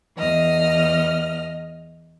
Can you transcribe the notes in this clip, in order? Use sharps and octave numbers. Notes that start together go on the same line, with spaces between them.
E2 D#5 F6